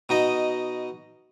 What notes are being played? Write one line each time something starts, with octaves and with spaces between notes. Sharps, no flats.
B2 D#4 D#5